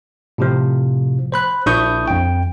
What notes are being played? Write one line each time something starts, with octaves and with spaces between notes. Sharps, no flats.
A2 C3 F3
C5 B5 F#6
A#1 D4 E4 C#6 D#6 G6
F2 G5